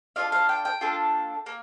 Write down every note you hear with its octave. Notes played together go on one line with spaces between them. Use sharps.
D4 F4 A4 F5
F5
G5
G5
A#3 D4 F4 A4
A#3